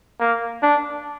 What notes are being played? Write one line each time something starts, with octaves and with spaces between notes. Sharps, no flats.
A#3
D4